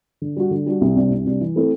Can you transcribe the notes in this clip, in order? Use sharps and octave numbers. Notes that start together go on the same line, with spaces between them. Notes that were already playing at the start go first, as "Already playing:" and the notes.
D3
G3 D4 F#4
D3
G3 D4 F#4
C2
C3 G3 D4
C2
C3 G3 D4
E3
A3 C4 E4 A4